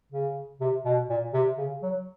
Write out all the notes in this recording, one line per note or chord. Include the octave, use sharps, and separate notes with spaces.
C#3
C3
B2
A#2
C3
C#3
F#3